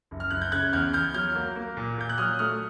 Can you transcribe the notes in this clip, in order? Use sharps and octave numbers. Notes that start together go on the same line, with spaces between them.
F#1
F6
F#1 F#6
G6
C#3 F#6 G#6
E2 F6 G6
E2 F6 G6
F#3 F6 G6
A#3
A#3
A#2
A#2 G6
F#6
F#3 D#6 F6
A3 D#6 F6